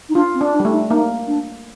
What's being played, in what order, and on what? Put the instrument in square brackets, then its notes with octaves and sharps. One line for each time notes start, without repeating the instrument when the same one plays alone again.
[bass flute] D#4
[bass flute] D4 [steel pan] F4
[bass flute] C4
[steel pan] D4
[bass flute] D4
[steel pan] G3
A3
[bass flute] D#4
[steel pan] A#3 [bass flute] D#4
[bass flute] D4